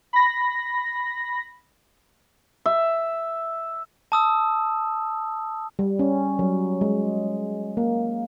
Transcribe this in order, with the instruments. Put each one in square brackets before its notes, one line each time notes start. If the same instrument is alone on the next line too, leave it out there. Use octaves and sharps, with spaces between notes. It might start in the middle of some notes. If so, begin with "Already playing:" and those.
[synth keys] B5 A#6
[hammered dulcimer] E5
[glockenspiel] A5 D#6 E6
[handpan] G3
C#4
F#3
G#3
A#3